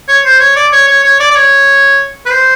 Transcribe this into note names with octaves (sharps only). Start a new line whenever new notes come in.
C#5
C5
C#5
D5
C#5
C#5
C#5
D5
D5
C#5
B4
C5